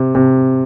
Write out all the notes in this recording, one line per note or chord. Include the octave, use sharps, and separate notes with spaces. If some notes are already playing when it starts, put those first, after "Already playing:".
Already playing: C3
C3